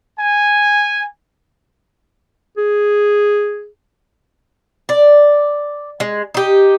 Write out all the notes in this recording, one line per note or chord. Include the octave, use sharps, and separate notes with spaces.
G#5
G#4
D5
G#3
D#4 G4